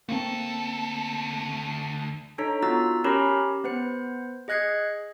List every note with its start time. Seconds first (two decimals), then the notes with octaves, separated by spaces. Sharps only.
0.09 D2 A#3 C4 A4
2.38 D4 D#4 A4 C#5 A#5 B6
2.62 B3 F4 F#4 A#5 E6 A6
3.04 C#4 G4 A#4 C#5 A#5 B5
3.29 G4
3.64 B3 B4 C5 C#7
4.48 G#4 D#5 F#6 G#6 C7 C#7